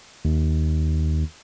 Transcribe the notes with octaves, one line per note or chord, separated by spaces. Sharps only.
D#2